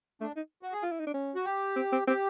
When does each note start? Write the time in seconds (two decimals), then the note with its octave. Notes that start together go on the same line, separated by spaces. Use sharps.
0.21 A3 D4
0.36 D#4
0.62 F#4
0.73 G#4
0.82 F4
0.91 E4
0.99 D#4
1.06 D4
1.14 C#4
1.35 F#4
1.45 G4
1.76 C4
1.92 C4
2.07 C4 G4